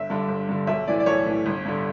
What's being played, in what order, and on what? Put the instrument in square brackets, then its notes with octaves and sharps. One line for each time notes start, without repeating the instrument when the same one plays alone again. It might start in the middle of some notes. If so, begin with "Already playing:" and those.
Already playing: [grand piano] G1 E5
G2 D3
G1
G2 D3
B1 E5
A2 E3 D5
D5
B1 C#5
A2 E3
G1
G2 D3